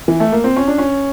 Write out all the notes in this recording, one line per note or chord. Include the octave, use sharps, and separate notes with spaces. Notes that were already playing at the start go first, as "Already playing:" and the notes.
E3
A3
A#3
C4
C#4
D4
C#4